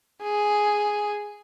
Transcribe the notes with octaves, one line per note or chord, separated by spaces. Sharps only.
G#4